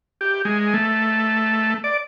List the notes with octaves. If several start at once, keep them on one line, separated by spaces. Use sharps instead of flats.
G4
G#3
A3
D5